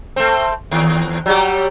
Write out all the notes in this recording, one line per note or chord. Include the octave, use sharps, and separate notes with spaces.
A3 C4
D#2
F#3 G3 G4